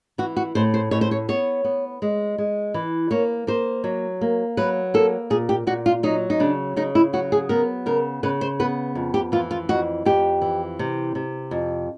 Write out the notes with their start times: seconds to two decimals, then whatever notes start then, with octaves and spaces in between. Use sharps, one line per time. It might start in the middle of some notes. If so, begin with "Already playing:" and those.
0.18 E3 F#4
0.37 F#4
0.55 A2 C5
0.74 C5
0.91 A2 C#5
1.01 C5
1.11 C#5
1.29 B3 C#5
1.64 B3
2.02 G#3
2.38 G#3
2.74 E3
3.11 A#3 C#5
3.47 A#3 C5
3.84 F#3
4.21 A#3
4.57 F#3 B4
4.94 A#3 A4
5.30 A#2 G#4
5.49 G4
5.67 A#2 F#4
5.86 F4
6.03 F#3 D#4
6.30 D#4
6.40 C#3 D4
6.76 C#3 D#4
6.95 E4
7.13 F#3 F#4
7.32 G#4
7.49 B3 A#4
7.86 C#3 A#4
8.23 C#3 B4
8.41 C5
8.60 B3 B4
8.95 F2
9.14 G4
9.32 E3 F4
9.51 F4
9.69 F2 F#4
10.05 F2 G4
10.42 E3
10.79 C3
11.15 C3
11.51 F2